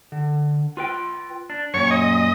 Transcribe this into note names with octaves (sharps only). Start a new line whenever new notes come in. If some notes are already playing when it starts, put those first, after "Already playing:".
D3
F4 B4 G5
D4
F#2 A#2 C#5 C#6
D#5